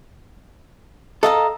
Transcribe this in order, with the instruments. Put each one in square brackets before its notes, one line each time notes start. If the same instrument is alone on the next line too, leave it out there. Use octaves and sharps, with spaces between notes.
[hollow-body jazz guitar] A4 [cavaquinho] D#5 F5 A#5